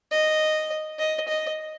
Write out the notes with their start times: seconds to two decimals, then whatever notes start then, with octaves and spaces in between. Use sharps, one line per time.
0.12 D#5
0.99 D#5
1.28 D#5